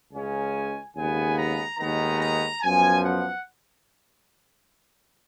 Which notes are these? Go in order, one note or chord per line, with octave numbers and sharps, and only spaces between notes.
C#2 C#3 G#3 C#4 G#5
D#2 C#3 G#3 B3 G#5
A#5
D#2 D#3 G#3 B3 A#5
A#5
F#2 F3 B3 G#5
F#5